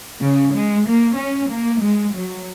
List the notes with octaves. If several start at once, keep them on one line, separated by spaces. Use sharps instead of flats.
C#3
G#3
A#3
C#4
A#3
G#3
F#3